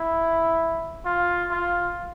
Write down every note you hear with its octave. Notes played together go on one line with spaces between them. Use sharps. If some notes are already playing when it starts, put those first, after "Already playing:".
Already playing: E4
F4
F4